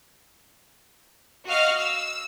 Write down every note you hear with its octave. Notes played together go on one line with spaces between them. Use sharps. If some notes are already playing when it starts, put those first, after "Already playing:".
F#4 D#5 F5 F6
E6